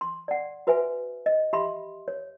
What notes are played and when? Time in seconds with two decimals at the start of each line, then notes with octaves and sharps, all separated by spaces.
0.01 C6
0.28 D5 F#5
0.67 F#4 B4 C5 E5 G#5
1.26 D#5
1.53 G4 E5 B5 C6
2.08 C#5